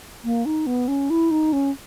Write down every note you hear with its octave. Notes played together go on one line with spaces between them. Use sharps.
A#3
D#4
B3
C#4
E4
D#4
C#4